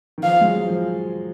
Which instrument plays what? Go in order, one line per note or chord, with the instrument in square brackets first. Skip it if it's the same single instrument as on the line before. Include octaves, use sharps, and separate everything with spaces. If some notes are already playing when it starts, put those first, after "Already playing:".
[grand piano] D#3
[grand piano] F3 [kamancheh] F5
[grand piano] G#3
F#3
F3